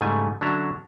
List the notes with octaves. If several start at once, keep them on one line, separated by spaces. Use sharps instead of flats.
G#2 C#3 E3 G3 A3 G#5
D3 F#3 C#4 D4 E5 A#5